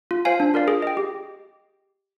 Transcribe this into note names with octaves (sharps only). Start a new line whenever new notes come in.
F4
C5 F5 G#5
D4
F4 A#4 D5 F5
G#4
D#5 G5
G4